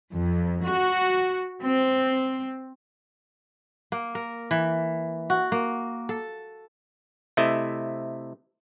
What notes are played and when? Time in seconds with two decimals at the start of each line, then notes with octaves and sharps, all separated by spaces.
0.13 F2
0.67 F#4
1.65 C4
3.92 A#3
4.15 A#4
4.51 E3
5.30 F#4
5.52 A#3
6.09 A4
7.37 C3 A3 E4 D#5